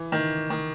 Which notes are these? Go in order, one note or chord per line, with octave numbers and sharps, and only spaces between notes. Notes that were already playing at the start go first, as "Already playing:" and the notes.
Already playing: E3
D#3
D#3